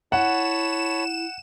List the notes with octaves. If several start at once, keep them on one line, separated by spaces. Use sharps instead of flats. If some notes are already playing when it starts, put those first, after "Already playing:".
E4 C#5 F#5 A5 B5 E7